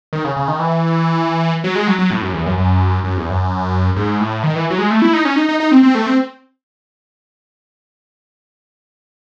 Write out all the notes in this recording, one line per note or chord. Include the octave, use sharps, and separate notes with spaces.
D#3
C#3
C#3
D#3
E3
F#3
G#3
F#3
F#3
A2
F#2
E2
F#2
F#2
F#2
E2
F#2
G#2
A2
D#3
E3
F#3
G#3
A3
E4
D#4
C#4
D#4
D#4
D#4
C4
C4
A3
C4